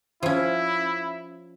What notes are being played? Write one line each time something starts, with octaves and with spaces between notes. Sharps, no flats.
F3 C#4 E4